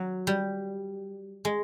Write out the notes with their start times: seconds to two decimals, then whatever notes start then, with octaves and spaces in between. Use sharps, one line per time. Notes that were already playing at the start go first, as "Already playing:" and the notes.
Already playing: F#3
0.27 G3
1.45 G#3